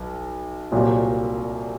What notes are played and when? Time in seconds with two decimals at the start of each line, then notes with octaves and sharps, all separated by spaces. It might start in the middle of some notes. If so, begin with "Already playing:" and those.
Already playing: B1
0.72 C2 A#2 F#3